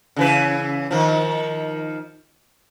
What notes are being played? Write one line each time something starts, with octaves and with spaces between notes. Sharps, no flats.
C#3 E3 B4
D#3 F3